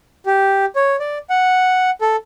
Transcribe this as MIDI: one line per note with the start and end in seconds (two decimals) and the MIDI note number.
0.26 0.65 67
0.76 0.96 73
1.00 1.18 74
1.30 1.90 78
2.01 2.16 69